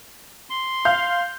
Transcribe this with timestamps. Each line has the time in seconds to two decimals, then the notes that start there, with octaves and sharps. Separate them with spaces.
0.50 C6
0.85 F5 G6